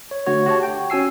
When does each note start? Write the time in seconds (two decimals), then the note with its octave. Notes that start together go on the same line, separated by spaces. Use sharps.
0.11 C#5
0.27 D3 A3 F#4 C#5
0.46 F#4 G4 C#5 A5
0.63 G5
0.90 C#4 F#4 G#5 E6 C7